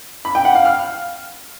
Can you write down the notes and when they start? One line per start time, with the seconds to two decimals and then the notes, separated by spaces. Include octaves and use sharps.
0.25 B5
0.35 G5
0.45 F#5
0.55 F5
0.65 F6